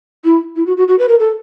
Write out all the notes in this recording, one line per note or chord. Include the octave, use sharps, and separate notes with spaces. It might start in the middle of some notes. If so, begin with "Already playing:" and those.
E4
E4
F#4
F#4
F#4
B4
A#4
A4